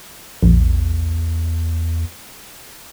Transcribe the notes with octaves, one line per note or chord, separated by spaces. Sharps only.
A#1 E2